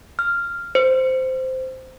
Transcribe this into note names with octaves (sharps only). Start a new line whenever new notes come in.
F6
C5